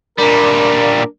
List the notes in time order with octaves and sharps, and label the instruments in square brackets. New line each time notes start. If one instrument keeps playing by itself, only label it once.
[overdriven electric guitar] A#2 G3 [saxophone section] D4 A#4